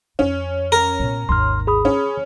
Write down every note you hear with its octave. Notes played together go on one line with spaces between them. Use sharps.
F2 C#4
A#4
A#2 B3
G#1 D#2 C6 F6
G#4 B5 D#6
C#4